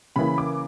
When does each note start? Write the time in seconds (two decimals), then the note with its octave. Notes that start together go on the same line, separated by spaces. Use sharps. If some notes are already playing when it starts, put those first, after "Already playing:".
0.16 C#3 E3 A#3 B5
0.38 D6